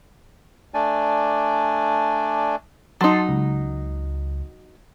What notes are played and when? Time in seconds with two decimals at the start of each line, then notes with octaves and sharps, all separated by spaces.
0.74 A3 D4 D5 G#5
3.01 F#3 D#4 A5 C6
3.29 C#2